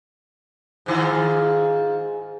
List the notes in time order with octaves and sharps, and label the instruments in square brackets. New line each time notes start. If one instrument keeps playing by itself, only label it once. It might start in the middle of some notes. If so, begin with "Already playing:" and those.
[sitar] G#2 D#3 F4